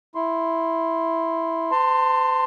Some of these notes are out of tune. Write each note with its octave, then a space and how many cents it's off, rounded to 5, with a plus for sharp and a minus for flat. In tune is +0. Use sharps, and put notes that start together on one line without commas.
E4 +0 C6 +0
C5 -45 A5 +30 C6 +0